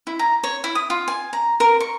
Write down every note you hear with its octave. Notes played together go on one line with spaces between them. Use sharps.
E4
A#5
C#5
E4
D#6
F4
G#5
A#5
A#4
C#6